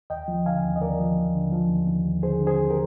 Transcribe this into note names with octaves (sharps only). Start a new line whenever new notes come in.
D#2 D#5 G5
F3
D3 F5 G#5
D#2
D#5
D#2 A#4 D5
F3
D#2
D3
F3
D#2
D#2
D#2
D3 G#4 C5
D3
G#4 C5
D#2
G4 A#4